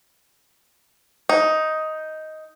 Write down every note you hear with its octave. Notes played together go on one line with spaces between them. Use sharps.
D#4